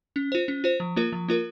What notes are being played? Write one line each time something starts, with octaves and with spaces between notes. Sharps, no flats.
C#4
F4 C5
C#4
F4 C5
F3
A#3 F4 A#4
F3
A#3 F4 A#4